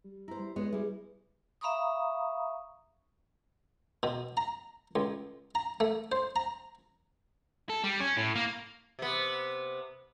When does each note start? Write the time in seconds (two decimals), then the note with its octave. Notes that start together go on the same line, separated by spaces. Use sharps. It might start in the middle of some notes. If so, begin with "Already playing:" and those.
0.04 G3
0.28 E4 C5 A#5
0.39 G3
0.56 G#3 B3 C#5
0.73 G3 E4 G#4
1.61 E5 F5 A#5 B5 C#6 D#6
4.03 B2
4.37 A#5
4.96 C#2
5.55 A#5
5.80 A3
6.12 C5
6.36 A#5
7.69 A4
7.84 G3
8.00 C#4
8.17 A2
8.35 A#3
8.99 C3 B3